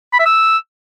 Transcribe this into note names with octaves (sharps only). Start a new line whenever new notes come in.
B5
E5
E6